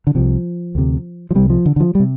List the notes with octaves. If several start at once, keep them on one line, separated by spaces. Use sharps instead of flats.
D3
C2 C3 F3
D2 C3
F3
C2 C3 G3
F3
D3
D3
F3
G3
C3